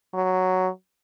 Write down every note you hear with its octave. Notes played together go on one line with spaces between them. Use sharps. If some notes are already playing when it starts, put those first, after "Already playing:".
F#3